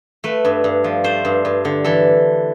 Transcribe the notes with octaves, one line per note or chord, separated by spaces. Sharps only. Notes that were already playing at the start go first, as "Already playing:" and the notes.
A3 B4
G2
G2
F3
A3 C5
G2
G2
D3
E3 A4